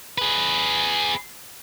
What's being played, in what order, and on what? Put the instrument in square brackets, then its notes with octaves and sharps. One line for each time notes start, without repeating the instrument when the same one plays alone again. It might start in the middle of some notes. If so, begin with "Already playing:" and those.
[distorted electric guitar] G#4 B4